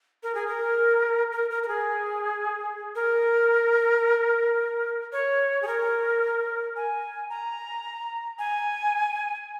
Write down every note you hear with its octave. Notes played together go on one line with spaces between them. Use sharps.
A#4
G#4
A#4
A#4
A#4
A#4
G#4
A#4
C#5
G#4
A#4
G#5
A#5
G#5